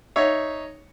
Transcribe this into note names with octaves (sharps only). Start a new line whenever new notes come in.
D#4 C#5 E5